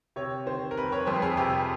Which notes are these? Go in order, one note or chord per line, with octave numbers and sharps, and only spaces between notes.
C3 C#5
D#3 C5
A#4
F1 B4
C#5
F2 C5
G#4
C3 G4